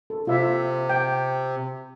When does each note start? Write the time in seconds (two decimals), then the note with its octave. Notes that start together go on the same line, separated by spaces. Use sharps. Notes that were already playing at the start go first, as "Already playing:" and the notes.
0.10 A4
0.27 C3 F4 E5
0.89 G5